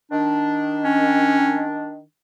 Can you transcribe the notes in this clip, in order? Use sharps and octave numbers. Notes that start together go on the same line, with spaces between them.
D#3 D4
C#4